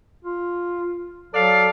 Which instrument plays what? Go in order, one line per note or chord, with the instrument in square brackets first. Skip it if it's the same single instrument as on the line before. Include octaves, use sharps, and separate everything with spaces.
[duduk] F4
[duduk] F#3 [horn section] A4 D5 F5